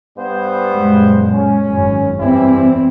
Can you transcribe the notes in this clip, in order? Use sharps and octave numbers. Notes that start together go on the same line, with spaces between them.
G2 B3 C5
F#2 A#2 G#3
C#4
G#1 F#2
E2 E3 G3 C4 E4